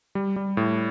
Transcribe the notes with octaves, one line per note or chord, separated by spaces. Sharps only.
G3
G3
A2